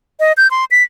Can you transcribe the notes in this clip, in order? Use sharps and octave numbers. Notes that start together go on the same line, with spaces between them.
D#5
G6
C6
B6